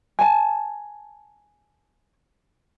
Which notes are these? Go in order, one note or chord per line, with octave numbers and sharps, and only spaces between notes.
G#5 A5